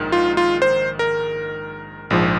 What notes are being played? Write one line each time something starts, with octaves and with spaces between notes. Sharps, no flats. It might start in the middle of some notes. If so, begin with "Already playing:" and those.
Already playing: A#1 G#2 D#3
F4
F4
C5
A#4
A#1 G#2 F3